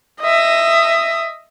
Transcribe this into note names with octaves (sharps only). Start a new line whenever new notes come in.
D#5 E5